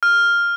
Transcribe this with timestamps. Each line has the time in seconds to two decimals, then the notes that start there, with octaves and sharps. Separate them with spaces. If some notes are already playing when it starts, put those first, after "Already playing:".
0.03 F6